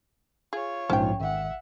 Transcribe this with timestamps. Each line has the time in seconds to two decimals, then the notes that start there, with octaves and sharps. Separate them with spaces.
0.53 F4 G#4 C#5
0.90 A#1 G#2 F3 C#4 G5
1.20 G#1 E5 F#5